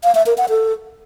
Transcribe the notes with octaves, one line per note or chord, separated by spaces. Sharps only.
F5
E5
A#4
F#5
A4